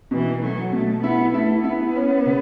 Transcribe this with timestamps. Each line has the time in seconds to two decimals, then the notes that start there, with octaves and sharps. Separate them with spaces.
0.11 B2 E3
0.42 F#3 A3
0.72 B2 A3
1.03 B3 E4
1.33 A3 E4
1.64 B3 E4
1.95 C#4
2.26 C#3